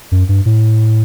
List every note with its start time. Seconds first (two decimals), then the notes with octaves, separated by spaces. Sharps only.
0.12 F#2
0.29 G2
0.46 A2